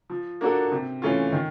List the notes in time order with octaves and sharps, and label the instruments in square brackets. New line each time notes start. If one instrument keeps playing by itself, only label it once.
[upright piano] F3
A#3 D4 F#4 A4
C3
E3 A3 C#4 F4
D#3